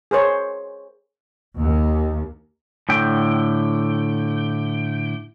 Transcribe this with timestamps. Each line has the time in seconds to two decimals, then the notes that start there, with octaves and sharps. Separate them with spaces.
0.11 G#4 A#4 C5 C#5
1.60 D#2
2.89 A2 D3 G5